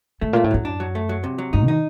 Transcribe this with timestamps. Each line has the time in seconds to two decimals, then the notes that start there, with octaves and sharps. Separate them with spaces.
0.21 A2 A3
0.33 A#2 A3
0.44 A2
0.51 F#2 F#3
0.65 D4
0.80 F#3
0.95 A3
1.09 F#3
1.24 C3
1.38 F#3
1.53 G2 D#4
1.64 D#3 D#4